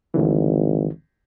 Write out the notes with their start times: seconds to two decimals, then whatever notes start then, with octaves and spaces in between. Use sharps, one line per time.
0.14 G#1 D2 D3 E3